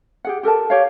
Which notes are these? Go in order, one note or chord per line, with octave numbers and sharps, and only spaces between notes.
G4 G#4 F#5
G4 A4 A#4 A5
G4 C#5 F5